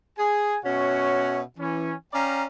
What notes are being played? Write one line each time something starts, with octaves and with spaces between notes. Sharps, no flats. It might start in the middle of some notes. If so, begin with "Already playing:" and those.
G#4 G#5
B2 C#4 F#4 C#5 E5 F#5
E3 C#4
C#4 D5 F5 G5 A#5